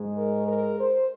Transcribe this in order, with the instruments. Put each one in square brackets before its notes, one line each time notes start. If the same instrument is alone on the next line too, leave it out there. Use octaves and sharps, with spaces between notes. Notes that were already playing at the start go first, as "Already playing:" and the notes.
Already playing: [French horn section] G#2 G#3
A#4
A#4
C5